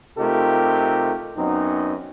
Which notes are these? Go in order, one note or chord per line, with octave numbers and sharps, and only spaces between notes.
C3 A3 D#4 F4 G4 A#4
F#2 B3 C4 D#4